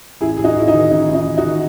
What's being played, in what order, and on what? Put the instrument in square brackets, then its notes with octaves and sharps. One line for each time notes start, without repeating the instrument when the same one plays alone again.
[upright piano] A1 E4 G#4
A1 G#4
D#4 F#4
A1 E4
D#4
D#3
A1 D#4
A1
D#4
A1
D#4 F#4
D#3